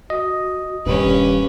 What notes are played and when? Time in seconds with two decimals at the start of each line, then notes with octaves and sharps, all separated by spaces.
0.10 F#4 D#5
0.86 D#1 G2 A#2 C#4 G4 B4